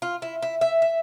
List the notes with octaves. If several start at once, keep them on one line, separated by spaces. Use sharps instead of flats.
F4
E4
E4
E5
E5